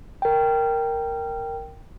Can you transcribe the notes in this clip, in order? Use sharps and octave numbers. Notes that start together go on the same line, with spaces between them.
A#4 G5